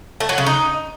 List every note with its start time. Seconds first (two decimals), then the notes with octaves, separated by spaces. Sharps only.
0.20 A3
0.29 F#3
0.38 C#3
0.46 D#4